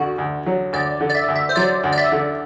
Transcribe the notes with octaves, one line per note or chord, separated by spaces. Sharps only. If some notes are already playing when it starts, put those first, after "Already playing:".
Already playing: D2 D3 F#4
D2
F#3
D2 D5
D3
D5
E5
D2
E5
C5
F#3 D5
D2
D5
E5
D3